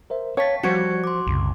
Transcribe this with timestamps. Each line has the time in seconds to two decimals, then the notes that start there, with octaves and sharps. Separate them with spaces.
0.10 A#4 C5 E5
0.37 C#5 F5 G5 A5 C#6 A6 B6
0.63 F3 G3 F#4 C5 C#6 G#6 C#7
1.04 C6 D6
1.27 C2 F#2 C#3